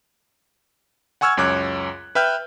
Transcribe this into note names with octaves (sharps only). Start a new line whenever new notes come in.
F#5 G#5 C#6 E6 F6 G#6
C#2 F#2 C#5 D6 F#6
B4 E5 G5 F6 G6